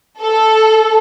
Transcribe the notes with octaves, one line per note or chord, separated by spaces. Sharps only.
A4